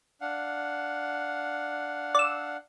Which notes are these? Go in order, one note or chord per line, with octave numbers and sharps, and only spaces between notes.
D4 F5 F#5
D5 E6